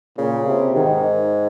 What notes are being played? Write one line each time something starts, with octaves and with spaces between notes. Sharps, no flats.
A#2 C#3
C3
G#2 D#3